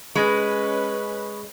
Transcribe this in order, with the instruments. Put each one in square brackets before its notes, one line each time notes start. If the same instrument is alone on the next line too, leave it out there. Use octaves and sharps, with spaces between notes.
[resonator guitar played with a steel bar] G#3 [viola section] C#4 B4 [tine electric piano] D#5 B5 C#6